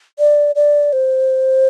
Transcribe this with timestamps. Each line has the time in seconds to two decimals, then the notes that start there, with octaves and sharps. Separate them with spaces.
0.19 D5
0.55 D5
0.93 C5